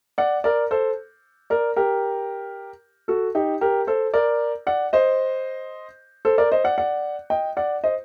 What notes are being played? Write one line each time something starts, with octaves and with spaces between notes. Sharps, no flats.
D5 F#5
A#4 D5
A4 C5
A#4 D5
G4 A#4
F#4 A4
D#4 G4
G4 A#4
A4 C5
A#4 D5
D5 F#5
C5 D#5
A4 C5
A#4 D5
C5 D#5
D5 F#5
D5 F#5
D#5 G5
D5 F#5
C5 D#5